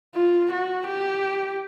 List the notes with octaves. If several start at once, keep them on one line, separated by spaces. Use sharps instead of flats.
F4
F#4
G4